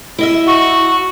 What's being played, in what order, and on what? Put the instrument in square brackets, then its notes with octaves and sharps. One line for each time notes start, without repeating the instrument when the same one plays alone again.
[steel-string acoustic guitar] E4 D#5 E5
[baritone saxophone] F#4